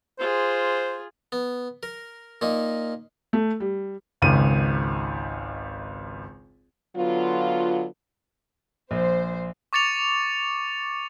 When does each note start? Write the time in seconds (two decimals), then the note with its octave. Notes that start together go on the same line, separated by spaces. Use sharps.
0.19 F4 G#4 C5
1.32 B3
1.83 A#4
2.41 A#2 A#3 D#4
3.33 A3
3.60 G3
4.22 G#1 C#2 D#7
6.96 D3 F#3 B3 F4
8.91 A#1 C5
9.73 C#6 D6 A6 C#7 F7